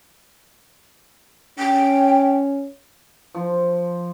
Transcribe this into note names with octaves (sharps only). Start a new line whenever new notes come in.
C#4 G5
F3